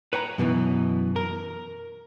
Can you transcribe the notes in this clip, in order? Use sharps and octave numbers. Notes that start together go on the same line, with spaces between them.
B4 C#5 G5 A#5
F#2 B2 D3 E3
A#4